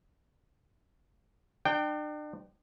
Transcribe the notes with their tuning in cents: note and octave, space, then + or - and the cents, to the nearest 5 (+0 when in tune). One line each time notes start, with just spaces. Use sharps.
D4 +40 G5 -5